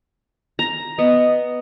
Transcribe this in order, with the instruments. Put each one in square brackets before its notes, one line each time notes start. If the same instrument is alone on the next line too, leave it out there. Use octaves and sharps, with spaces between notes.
[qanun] A#5
[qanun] B3 [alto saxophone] D#5